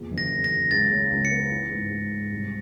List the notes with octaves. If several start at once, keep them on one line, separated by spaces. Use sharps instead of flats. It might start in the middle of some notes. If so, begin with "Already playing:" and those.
Already playing: E2 A#2
F#1
A#6
E2
A#6
F#1
C#2 A6
C#3
C#2
C#7
B3
E3
G#2
G#2
G#2
C2